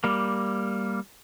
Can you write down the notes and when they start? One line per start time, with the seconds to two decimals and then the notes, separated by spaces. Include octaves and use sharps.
0.04 G3 A#3